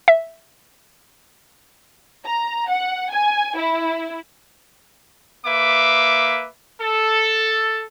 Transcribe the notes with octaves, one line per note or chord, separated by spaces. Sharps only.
E5
A#5
F#5
G#5
E4
A#3 B4 E5 D6
A4